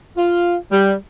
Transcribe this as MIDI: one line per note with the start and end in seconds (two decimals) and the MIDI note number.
0.16 0.55 65
0.71 0.93 55